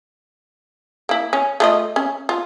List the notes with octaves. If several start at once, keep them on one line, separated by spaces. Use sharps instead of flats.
A#3 E4
C#4
A3 F4 D#5
C#4
F4